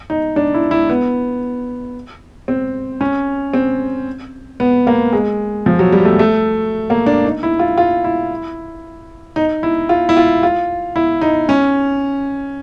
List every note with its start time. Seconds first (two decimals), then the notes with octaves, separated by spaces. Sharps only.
0.10 D#4
0.36 D4
0.54 E4
0.71 E4
0.89 B3
2.48 C4
3.01 C#4
3.54 C4
4.60 B3
4.87 A#3
5.13 G#3
5.66 F3
5.79 F#3
5.92 G3
6.05 A3
6.19 A3
6.90 A#3
7.06 D4
7.25 D#4
7.43 E4
7.59 F4
7.78 F4
8.04 E4
9.36 D#4
9.63 E4
9.89 F4
10.09 E4
10.17 F4
10.43 F4
10.96 E4
11.21 D#4
11.49 C#4